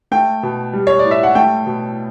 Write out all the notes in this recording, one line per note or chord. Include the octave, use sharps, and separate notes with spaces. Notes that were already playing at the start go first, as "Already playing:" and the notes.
A3 G5
B2
G3
C#5
D5
A2
E5
F#5
A3 G5
B2